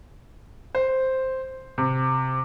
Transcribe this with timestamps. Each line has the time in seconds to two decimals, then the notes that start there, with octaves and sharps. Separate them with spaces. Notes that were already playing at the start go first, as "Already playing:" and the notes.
0.75 C5
1.78 C3